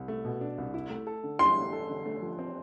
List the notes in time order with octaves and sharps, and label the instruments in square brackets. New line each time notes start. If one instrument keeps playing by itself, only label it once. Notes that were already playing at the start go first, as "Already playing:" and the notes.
Already playing: [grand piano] C2
A3
B2
D4
C2
E4
A3
A4
D3
[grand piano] E4 [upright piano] C6
[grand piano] A3
A4
D3
A3
F3
C4